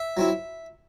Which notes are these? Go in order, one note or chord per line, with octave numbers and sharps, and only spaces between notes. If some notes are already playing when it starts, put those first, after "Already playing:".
Already playing: E5
F#3 C4 E4